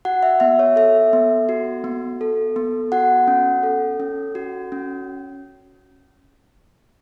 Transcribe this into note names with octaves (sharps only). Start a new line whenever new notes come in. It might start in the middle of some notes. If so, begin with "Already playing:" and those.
F#4 F#5
E5
B3 E5
C#5
A4 E5
B3
F#4
B3
A4
B3
F#4 F#5
C#4
A4
C#4
F#4
C#4